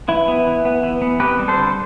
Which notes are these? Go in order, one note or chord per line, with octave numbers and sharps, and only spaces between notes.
E3 E4
B3
E3
B3
E3
B3
C4 G4 B4
G3
A4 C5
D3